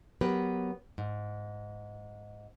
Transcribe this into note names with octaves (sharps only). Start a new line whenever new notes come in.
F#3 B3 G4 A#4 B4
G#2